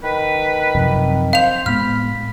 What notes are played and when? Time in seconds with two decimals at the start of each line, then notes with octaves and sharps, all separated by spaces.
0.03 D#3 B4
0.75 F#2 C3 F3
1.33 C5 F5 F7
1.66 A2 G#3 B3 B5 F6